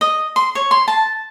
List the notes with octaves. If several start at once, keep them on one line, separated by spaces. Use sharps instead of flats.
D#5
C6
C#5
C6
A5